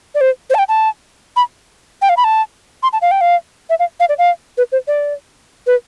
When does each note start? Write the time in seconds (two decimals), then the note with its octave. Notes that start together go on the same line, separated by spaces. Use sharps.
0.15 D5
0.21 C5
0.50 C5
0.54 A5
0.58 G5
0.68 A5
1.36 B5
2.02 G5
2.09 F5
2.17 B5
2.24 A5
2.83 C6
2.93 A5
3.02 F5
3.11 G5
3.21 F5
3.70 E5
3.79 F5
4.00 F5
4.09 D5
4.18 F5
4.57 B4
4.72 C5
4.87 D5
5.67 B4